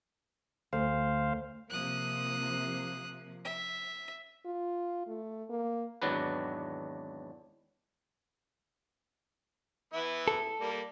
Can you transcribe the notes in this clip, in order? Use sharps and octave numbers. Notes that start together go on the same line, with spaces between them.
D2 C5 F5
C3 F3 A#3 D#6 F#6
E5
F4
A3
A#3
G#1 E2 F#3 D4 B4
E3 B3 E4
A4
G3 A#3